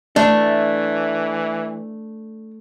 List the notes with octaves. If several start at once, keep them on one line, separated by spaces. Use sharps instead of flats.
E3 A3 D4